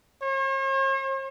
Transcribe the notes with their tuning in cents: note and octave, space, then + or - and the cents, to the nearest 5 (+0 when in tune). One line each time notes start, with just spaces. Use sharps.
C#5 -45